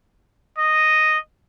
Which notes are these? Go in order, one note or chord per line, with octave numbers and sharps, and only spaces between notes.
D#5